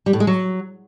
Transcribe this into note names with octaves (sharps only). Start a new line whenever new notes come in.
G3
A2
G#3
F#3